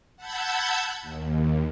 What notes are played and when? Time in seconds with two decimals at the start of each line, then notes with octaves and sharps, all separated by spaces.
0.16 F#5 A5 B5 E6 G6 G#6
1.02 D#2